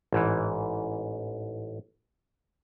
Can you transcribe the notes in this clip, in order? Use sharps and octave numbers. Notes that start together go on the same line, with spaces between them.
A1 G#2 E3